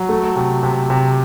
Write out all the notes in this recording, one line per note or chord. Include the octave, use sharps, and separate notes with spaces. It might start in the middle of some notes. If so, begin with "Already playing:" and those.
Already playing: F#3
A3
C3
C3
C3